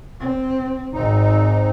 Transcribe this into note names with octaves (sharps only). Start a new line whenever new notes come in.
C4
G#1 G#2 C4 D#4